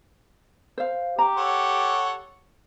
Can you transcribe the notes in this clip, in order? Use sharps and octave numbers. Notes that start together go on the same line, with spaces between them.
C5 F5
G4 A#5
A4 C#5 F#5